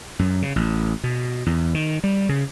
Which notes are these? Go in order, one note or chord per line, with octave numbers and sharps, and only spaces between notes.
F#2
C#3
A1
B2
E2
D#3
G3
C#3